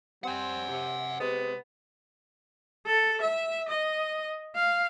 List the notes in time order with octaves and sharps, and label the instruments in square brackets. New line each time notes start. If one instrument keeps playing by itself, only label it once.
[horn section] G3 C4 [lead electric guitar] F#5 G#5
[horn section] C3
C3 G#3 B3
[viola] A4
E5
D#5
F5